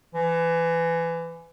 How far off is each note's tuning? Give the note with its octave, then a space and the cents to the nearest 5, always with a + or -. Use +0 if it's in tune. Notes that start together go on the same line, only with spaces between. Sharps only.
E3 +25